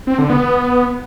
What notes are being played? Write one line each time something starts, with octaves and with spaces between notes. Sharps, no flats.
C4
D3
B3